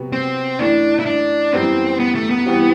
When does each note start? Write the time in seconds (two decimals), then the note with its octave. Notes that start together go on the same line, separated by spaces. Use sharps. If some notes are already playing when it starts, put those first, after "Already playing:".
Already playing: C3 F#3 B3
0.13 C4
0.59 F#2 E3 A3 D4 E4
1.00 E4
1.06 D4
1.53 F#2 E3 G3 B3 C4 E4
2.00 B3
2.15 A3
2.30 B3
2.46 E3 G3 C4 F#4